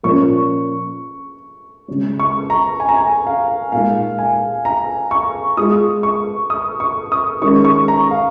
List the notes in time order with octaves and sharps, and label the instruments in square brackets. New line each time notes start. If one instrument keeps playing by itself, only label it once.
[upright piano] A#2 F3 C#4 [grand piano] C#6
[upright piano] C#3 G#3 C#4
[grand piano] C#6
A#5
G#5
A#5
G#5
F5
[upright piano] A#2 G#3 D#4 [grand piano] F5
[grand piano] G#5
A#5
C#6
[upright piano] G#3 F4 G#4 [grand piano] D#6
[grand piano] C#6
D#6
C#6
D#6
[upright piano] D#3 G#3 C#4 A#4 [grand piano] C#6
[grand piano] C#6
A#5
F5